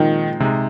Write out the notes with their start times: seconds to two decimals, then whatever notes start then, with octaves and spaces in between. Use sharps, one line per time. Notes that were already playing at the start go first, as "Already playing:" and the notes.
Already playing: A#2 D#3 F3 G#3 C4 D#4
0.40 C3 G#3 D#4